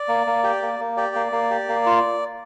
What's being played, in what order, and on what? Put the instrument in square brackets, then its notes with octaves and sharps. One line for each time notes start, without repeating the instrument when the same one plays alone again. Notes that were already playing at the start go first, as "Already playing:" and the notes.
Already playing: [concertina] D5
A#3
A#3
G4
A#3
A#3
G4 D5
A#3
A#3
G4
A#3
F4